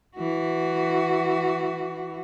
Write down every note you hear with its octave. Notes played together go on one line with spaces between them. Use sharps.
E3 F#4